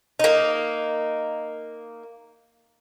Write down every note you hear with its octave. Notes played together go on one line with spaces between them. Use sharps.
A#3 D#4